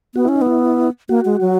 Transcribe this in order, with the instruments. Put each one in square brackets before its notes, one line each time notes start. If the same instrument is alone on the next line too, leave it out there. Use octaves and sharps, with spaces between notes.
[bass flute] B3 [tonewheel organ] F#4
[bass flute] C#4 [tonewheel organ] E4
[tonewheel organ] D#4
[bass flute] B3 [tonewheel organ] E4
[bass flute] A#3 [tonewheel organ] F#4
[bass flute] G#3
F#3